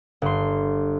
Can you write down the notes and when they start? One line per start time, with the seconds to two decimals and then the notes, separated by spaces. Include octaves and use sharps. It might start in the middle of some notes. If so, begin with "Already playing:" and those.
0.22 G1 C6